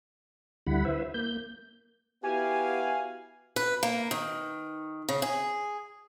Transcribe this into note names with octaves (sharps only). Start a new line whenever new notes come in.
D2 D3 G3 E4 F#5 B5
E4 B4 C5 E5
A#3 G6
B3 E4 F#4 G4 F5 G#5
B4
A#3
D#3
C#3
G#4